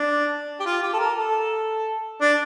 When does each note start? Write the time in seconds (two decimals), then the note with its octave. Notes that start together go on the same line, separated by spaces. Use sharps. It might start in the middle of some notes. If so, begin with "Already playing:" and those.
Already playing: D4
0.60 G4
0.66 F4
0.83 G4
0.93 A4
1.00 A#4
1.17 A4
2.21 D4